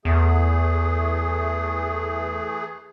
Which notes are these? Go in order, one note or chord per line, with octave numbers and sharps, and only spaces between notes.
E2 E3 A3 G#4